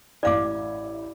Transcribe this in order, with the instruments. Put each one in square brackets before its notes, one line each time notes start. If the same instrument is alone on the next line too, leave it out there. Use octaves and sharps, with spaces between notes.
[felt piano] A1 E4 [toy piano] D5 F5 D6